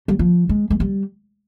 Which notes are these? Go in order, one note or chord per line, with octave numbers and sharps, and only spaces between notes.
G3
F3
G#3
G#3
G3